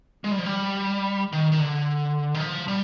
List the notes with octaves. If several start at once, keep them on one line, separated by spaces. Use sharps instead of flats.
G#3
G3
F3
G3
D#3
D#3
D3
D#3
F3
G3